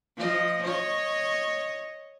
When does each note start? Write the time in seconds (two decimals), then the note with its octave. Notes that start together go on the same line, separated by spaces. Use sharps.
0.17 F3 D#5
0.64 C#5 D#5